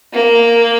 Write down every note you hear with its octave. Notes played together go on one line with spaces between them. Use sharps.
A#3